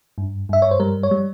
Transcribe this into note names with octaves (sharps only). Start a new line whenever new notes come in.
G2
G2 E5
C#5
C5
G3 A#4
C#5
G3